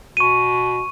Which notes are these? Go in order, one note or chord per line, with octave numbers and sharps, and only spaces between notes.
B2 C#6 D#7